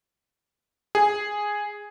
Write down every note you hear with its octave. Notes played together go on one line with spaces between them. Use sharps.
G#4